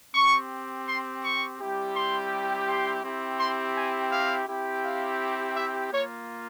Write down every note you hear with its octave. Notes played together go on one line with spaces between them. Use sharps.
C4 G4 C#6
C6
C#6
G3 C4 E4 G4
C6
C6
C4 E4 G4
C6
G#5
F5
C4 E4 G4
F5
E5
A#3 F4 C#5